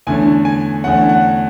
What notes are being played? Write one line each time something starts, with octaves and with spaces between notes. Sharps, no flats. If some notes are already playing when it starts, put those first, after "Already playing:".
E2 D3 A3 C#4 G#5
G#5
E2 D3 A3 C#4 F#5
F#5